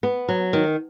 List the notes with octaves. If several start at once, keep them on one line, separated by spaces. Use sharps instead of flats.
B3
F#3
D#3